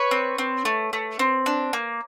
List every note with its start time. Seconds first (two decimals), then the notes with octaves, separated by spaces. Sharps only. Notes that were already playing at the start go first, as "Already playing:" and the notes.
Already playing: B4 C#5
0.11 C4
0.38 C4
0.65 A3
0.93 A3
1.19 C4
1.46 D4
1.73 A#3